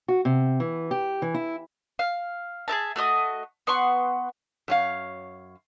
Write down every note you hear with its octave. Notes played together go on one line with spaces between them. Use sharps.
F#4
C3
E3
G4
E3
E4
F5
G#4 A#4 E5 A5
A3 F#4 D#5 D#6
B3 F#5 C6 C#6
F#2 C#5 F5